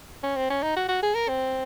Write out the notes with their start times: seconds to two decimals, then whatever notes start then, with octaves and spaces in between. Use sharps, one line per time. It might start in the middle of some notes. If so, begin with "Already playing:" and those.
0.23 C#4
0.36 C4
0.50 C#4
0.63 D#4
0.76 F#4
0.88 F#4
1.03 G#4
1.15 A#4
1.28 C4